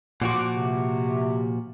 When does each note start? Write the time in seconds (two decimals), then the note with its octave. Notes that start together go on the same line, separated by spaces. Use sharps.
0.22 A#2 F3 F#4 F#5 C6 D6
0.55 C3